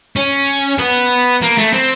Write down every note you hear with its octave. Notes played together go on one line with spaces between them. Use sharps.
C#4
B3
A#3
A3
C4